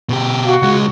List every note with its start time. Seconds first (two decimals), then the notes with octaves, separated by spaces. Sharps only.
0.09 B2 G4
0.43 F#4 F5
0.62 C#2 G#3